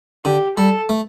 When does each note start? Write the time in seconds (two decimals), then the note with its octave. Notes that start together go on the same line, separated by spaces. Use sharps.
0.25 D3 G4
0.57 G3 A4
0.89 A3